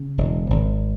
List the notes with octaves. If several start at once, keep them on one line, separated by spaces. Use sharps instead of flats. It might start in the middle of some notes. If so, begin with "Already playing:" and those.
Already playing: C#3
E1
G#1